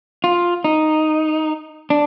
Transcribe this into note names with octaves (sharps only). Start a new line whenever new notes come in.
F4
D#4
D4